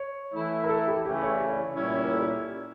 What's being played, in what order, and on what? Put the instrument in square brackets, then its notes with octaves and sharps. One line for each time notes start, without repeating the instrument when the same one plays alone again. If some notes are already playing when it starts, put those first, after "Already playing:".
Already playing: [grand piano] C#5
[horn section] E3 A3 E4
[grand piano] A#4
A4
G4
[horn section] C#3 E3 A3 C#4 E4 [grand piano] G4
[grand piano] A4
C#5
D5
C#5
D5
C#5
[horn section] A#2 G3 C#4 E4
[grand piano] D5
C#5
A#4
A4
G4